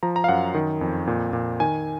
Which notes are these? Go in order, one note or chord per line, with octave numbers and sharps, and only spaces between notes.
F3 A#5
A#5
F5
F#2 F#5
D#3
F2
A#2
A#2
D#3 G#5